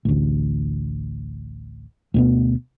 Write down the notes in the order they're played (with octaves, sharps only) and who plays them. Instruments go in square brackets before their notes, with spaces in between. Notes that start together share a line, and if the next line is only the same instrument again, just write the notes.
[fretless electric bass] A1 D2
D2 B2 B3